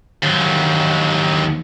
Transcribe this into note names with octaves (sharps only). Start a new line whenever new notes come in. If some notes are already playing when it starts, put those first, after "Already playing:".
D#2 F#3